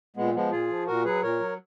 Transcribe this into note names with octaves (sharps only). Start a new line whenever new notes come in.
A#2 G#3 B3
F3 G#3 B3
A#2 F4 G#4
F3
A#2 F#4 A#4
F#3 G#4 B4
A#2 A#4 C#5
F#3